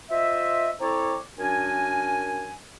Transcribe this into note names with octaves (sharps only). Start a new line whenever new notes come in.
F4 C5 D#5 E5
C4 E4 A4 C#5 D5 A#5
F#2 D4 A#4 G#5